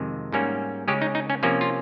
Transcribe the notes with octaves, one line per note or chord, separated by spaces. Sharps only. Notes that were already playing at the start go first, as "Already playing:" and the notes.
Already playing: F2 C3 D#3 G#3
G#2 G3 A#3 C#4
C#3 G#3 C#4 G4
D#4
D#4
C#4
C3 F3 A#3 C#4
F4